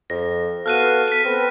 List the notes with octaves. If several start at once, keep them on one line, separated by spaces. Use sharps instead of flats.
F2 A#6
B3 F#4 A4 F5 F6 F#6 D#7
B6 D#7
B3 C4 A4 B4